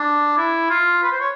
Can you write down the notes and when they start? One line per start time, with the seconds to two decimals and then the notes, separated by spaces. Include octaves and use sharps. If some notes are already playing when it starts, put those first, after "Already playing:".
Already playing: D4
0.37 E4
0.70 F4
1.03 B4
1.12 C5
1.20 C#5